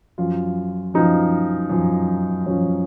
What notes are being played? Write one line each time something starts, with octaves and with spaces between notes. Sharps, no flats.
F#2 F3 F4
F#2 F3 D#4
F#2 F3
F#2 F3 C#4